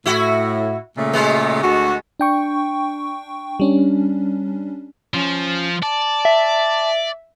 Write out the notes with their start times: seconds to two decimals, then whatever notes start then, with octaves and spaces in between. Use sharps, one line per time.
0.06 A2 E4 F#4
0.97 A#2 C#3 A3
1.13 B2 G#3 B3
1.63 D2 F#4
2.20 D4 G5 C#6
3.60 G3 C#4 D4
5.14 F3 C#4
5.83 D5 A5
6.25 E5